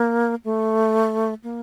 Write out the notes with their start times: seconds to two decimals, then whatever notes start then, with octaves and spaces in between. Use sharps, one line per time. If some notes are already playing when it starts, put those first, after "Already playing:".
Already playing: A#3
0.45 A3
1.44 A#3